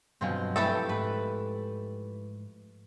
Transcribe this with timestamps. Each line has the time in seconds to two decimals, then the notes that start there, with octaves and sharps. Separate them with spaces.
0.21 G2 B2 F3 F#3 C4 G#5
0.56 E3 A3 G4 A4
0.89 G#2 B4